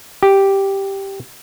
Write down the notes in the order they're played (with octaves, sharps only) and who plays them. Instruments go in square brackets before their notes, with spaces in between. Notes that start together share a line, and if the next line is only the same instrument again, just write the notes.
[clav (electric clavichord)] G4